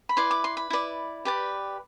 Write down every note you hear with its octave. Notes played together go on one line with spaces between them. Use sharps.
B5
E4 B4 D5 C6
D6
C6
B5
E4 B4 D5
G4 B4 D5